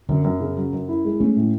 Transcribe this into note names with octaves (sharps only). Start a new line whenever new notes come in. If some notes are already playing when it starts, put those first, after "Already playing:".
F#2 D3
F#2
C#3
F#3
F#2
E4
G#3
A3 C#4
A2